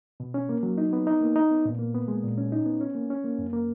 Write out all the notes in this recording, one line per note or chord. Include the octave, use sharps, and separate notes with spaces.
B2
C#4
A#3
F#3
D#4
B3
D#4
A#3
D#4
B3
A#2
A#3
B3
G#3
A#2
C#4
D#4
B3
C#4
A#3
C#4
A#3
F#2
A#3